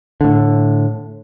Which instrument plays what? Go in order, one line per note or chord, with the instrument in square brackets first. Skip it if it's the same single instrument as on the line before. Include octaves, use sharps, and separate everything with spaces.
[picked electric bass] A2 D3